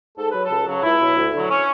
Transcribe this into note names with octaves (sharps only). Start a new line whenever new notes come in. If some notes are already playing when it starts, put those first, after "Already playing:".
G#2 A4
F#3 B4
A4
C#2
C#3 F#3
C#2 E4
B2 F#3
D2
D3 F#3
C#4